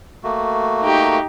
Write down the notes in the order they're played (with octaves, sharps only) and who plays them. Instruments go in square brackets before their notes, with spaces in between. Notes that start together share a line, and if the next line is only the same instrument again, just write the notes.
[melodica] A3 A#3 F#4
[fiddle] D#4 G4